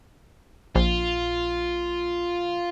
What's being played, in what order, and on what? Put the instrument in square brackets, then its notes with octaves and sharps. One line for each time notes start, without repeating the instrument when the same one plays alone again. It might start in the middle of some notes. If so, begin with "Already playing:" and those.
[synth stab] A#1 [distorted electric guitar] F4